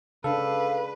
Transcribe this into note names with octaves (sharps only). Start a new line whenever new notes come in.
C#3 D4 A4 B4 F5